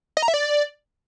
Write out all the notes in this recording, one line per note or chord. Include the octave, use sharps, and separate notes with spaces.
D#5
A#5
E5
D5